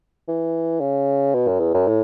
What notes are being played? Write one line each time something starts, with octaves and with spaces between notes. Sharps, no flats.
E3
C#3
B2
F#2
E2
F#2
A2